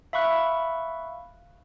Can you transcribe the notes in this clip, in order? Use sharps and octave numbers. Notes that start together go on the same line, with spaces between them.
E5 F5 B5 C#6 F#6